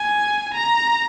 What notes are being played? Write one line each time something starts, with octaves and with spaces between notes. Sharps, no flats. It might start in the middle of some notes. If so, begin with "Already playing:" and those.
Already playing: G#5
A#5